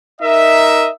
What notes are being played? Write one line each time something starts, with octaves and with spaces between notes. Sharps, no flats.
D#4 A#4 D#5 E5